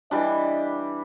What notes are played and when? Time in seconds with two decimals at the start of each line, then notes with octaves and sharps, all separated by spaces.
0.11 E3 G3 D4 D#5